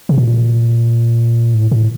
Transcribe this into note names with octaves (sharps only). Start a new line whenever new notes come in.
C3
A#2
A2
A2